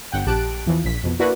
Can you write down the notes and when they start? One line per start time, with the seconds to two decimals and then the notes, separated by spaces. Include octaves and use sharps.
0.12 G1 F#5 G5
0.27 A#1 G4 A5 F#6 D7
0.66 E2 E3 F3
0.84 A#1 B6
1.03 F2 B2
1.19 A#3 D4 E4 F#4 B4